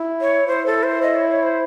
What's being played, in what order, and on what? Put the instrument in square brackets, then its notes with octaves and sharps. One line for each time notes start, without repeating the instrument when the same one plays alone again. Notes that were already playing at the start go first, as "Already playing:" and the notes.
Already playing: [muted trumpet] E4
[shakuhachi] C#5
[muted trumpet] E4 [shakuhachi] C5
[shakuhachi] A4
C5
D#5
C#5
C#5
C5